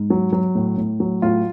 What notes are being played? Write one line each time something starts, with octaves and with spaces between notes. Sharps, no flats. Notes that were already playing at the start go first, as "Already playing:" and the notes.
Already playing: G#2
F#3
F#3
A2
A2
F#3
A2 F4